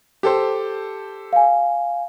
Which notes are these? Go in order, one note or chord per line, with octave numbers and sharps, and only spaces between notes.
G4 A4 C5
F5 G#5